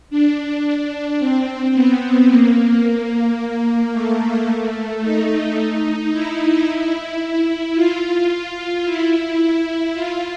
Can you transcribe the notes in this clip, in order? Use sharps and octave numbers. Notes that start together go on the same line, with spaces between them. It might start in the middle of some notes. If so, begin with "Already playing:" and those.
D4
C4
B3
A#3
A#3
A3
D#4
E4
E4
F4
E4
F4